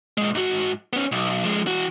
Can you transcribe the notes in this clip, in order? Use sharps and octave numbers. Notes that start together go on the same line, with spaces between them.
A#2 G#3
G#2 F#4
B3 C#4
B1
F3 G#3
E3 F#4